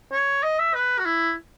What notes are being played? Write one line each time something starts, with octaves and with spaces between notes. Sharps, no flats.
C#5
D#5
E5
B4
F#4
E4